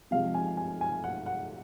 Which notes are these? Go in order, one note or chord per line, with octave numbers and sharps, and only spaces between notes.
C3 F3 G#3 F5
G#5
G#5
G#5
F#5
F#5